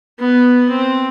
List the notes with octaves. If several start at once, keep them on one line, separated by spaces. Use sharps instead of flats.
B3
C4